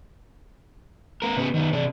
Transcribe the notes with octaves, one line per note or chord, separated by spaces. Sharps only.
B3 A#4
C#3 B3
D#3 B3
C3 D4